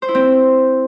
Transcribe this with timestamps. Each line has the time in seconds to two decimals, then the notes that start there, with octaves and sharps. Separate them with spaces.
0.02 C5
0.08 E4
0.15 C4